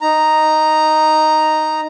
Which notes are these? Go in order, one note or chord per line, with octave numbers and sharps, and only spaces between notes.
D#4 A#5